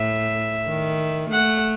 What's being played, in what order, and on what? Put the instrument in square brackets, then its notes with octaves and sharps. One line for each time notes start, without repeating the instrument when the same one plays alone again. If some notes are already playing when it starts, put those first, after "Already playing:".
Already playing: [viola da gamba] A2 [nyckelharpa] E5
[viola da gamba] D#3
[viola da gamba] A3 [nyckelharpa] F#5